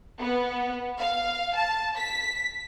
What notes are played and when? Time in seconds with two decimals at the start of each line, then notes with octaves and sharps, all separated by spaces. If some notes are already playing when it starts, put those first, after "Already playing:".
0.21 B3
0.99 F5
1.56 A5
1.98 B6